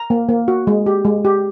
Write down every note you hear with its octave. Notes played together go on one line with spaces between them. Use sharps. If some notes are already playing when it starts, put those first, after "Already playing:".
Already playing: A#5
A#3
A#3
F#4
G#3
G4
G#3
G4